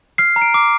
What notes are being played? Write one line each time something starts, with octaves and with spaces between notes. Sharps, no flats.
F6 C7
A#5
D7
D6